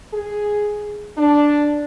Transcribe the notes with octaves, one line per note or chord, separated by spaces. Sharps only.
G#4
D4